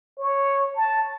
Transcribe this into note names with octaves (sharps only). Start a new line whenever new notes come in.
C#5
A5